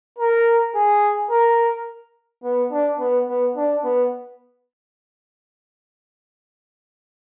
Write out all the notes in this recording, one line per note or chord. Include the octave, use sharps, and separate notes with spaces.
A#4
G#4
A#4
B3
D4
B3
B3
D4
B3